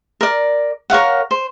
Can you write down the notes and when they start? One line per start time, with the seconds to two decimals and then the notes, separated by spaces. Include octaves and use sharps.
0.21 A#4 D5
0.90 A#4 C#5 F5 F#5
1.31 C5